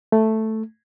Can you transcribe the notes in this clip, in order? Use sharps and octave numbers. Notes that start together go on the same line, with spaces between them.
A3